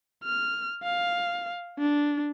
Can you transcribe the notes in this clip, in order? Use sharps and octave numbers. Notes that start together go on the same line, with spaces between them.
F6
F5
D4